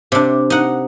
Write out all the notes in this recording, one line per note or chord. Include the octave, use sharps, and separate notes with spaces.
C3 D4
D#4 F#5